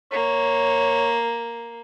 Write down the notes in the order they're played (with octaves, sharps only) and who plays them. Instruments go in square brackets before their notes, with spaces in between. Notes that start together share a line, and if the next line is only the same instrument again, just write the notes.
[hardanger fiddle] A#3 [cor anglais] C#5